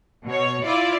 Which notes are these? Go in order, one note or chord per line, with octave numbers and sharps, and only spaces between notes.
B2 C#5
E4 F4 D5